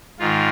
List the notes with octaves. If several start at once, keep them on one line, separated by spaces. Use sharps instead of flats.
G#2 D#3 F4